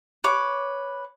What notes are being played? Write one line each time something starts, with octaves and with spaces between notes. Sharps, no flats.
B4 C#5 D6